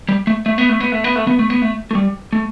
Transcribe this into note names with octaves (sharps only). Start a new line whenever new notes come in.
G3
A3
A3
B3
A3
B3
A3
B3
A3
B3
A3
B3
A3
A3
G3
A3